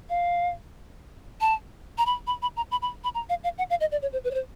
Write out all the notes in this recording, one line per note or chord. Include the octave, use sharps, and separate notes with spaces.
F5
A5
A#5
B5
B5
B5
A#5
B5
B5
B5
A#5
F5
F5
F#5
F5
D#5
D5
C#5
C5
B4
C#5
C5